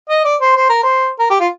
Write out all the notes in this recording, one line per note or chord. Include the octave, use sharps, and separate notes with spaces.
D#5
D5
C5
C5
A#4
C5
A#4
G4
F4